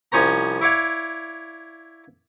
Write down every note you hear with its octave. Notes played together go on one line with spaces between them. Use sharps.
C2 F3 C#4 C5 A#5
E4 C#5 D5 F5